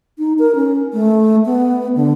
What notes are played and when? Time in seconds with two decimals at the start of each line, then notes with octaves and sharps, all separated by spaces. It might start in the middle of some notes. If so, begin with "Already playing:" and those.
0.19 D#4
0.39 A#4
0.55 C#4
0.93 A3
1.46 B3
1.96 D3